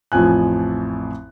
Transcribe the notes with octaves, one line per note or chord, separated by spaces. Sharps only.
A1 F2 F3 G#5 F#6